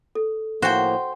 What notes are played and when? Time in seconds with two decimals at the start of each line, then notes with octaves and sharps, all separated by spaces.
0.15 A4
0.62 A2 F3 A#3 F#4 C5 G5